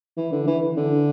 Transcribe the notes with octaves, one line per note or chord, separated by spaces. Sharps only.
E3
D3
E3
D3